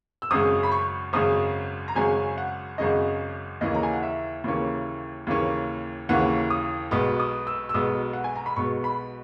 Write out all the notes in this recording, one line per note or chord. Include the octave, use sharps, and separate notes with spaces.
E6
G#1 F#2 C#3 G#3 C#4 D#6
B5
C#6
G#1 F#2 C#3 G#3 C#4 D#6
A#5
G#1 F#2 C#3 G#3 C#4 G#5
F#5
G#1 F#2 C#3 G#3 C#4 D#5
D#2 C#3 E3 A#3 C#4 D#5
A#5
G#5
F#5
E5
D#2 C#3 E3 A#3 C#4
D#2 C#3 E3 A#3 C#4
D#2 C#3 E3 A#3 C#4 F#5
D#6
B1 B2 G#3 B3 D#6
D#6
E6
E6
B1 B2 G#3 B3 D#6
F#5
G#5
A#5
B5
B1 B2 G#3 B3 C#6
B5